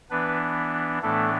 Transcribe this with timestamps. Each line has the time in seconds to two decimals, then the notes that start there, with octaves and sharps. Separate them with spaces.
0.11 E3 B3 D4 B4
1.02 A2 E3 A3 B3 D4 A4